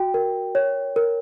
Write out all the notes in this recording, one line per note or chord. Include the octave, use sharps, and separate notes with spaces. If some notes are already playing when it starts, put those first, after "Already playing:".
Already playing: F#4 G5
A#4
C#5
A#4